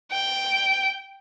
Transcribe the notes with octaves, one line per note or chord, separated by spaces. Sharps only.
G5